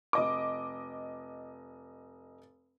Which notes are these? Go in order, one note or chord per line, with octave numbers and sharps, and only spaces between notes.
F1 D#5 D6